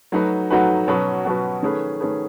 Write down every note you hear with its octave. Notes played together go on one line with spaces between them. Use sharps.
F#3 A3 D#4 F#4 B4
F#3 A3 D#4 F#4 B4
B2 F#3 C#4 F#4 B4
B2 F#3 C#4 F#4 B4
D#3 A3 C#4 G#4 B4
D#3 A3 C#4 G#4 B4